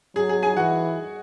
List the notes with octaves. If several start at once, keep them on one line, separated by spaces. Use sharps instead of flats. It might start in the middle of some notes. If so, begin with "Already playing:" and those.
F#3 G#4
G#4
G#4 G#5
E3 F#4 F#5